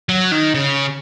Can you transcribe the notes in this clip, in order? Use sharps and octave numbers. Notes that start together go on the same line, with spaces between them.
F#3
D#3
C#3